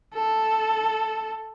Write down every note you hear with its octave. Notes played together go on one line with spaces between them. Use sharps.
A4